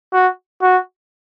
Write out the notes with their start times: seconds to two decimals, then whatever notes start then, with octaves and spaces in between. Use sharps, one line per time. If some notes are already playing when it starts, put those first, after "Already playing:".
0.13 F#4
0.62 F#4